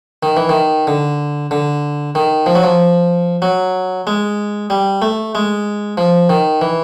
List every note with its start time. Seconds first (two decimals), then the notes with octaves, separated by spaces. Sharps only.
0.23 D#3
0.37 E3
0.49 D#3
0.87 D3
1.51 D3
2.15 D#3
2.46 F3
2.55 F#3
2.63 F3
3.42 F#3
4.07 G#3
4.70 G3
5.02 A3
5.35 G#3
5.97 F3
6.29 D#3
6.61 E3